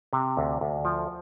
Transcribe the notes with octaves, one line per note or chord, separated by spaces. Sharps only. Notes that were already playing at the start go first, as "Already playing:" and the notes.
C3
D2
D2
F3